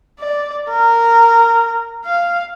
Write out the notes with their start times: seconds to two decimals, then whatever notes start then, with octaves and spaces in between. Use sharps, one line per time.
0.20 D5
0.70 A#4
2.05 F5